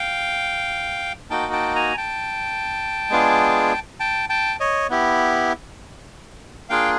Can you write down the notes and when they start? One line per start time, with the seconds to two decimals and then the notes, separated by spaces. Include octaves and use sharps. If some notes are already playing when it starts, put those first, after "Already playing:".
Already playing: F5 G5
1.30 A#3 D#4 F#4 G5 A5
1.53 G5 A5
1.75 G#5 A#5
1.97 G5 A5
3.10 G#3 B3 D4 F4 G#4
4.00 G5 A5
4.29 G5 A5
4.60 C#5 D#5
4.90 B3 E4 G4
6.69 A#3 D4 F4 G#4 F5 G5